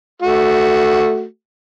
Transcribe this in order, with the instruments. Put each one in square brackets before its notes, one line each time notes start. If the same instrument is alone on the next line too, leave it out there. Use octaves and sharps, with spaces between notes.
[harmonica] A3 F#4